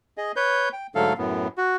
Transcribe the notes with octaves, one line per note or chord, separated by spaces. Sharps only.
G#4 D#5
B4 C#5 G6
G5
G#2 D3 F#3 A3 A4 F5
F#2 A2 B3
F#4